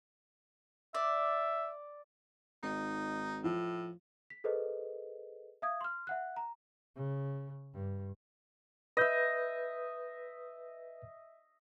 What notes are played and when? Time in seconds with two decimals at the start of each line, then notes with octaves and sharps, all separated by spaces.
0.95 D5 E5
2.63 G#1 D#4
3.44 A2 F3
4.30 B6
4.44 G#4 A4 B4 C5 D#5
5.62 E5 F5 D#6 G#6
5.81 C6 F6
6.07 E5 F#5 F#6
6.36 A#5
6.96 C#3
7.73 G2
8.97 B4 D#5 E5 G6